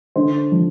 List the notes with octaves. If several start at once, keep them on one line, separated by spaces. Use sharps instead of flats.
D3 C5
F3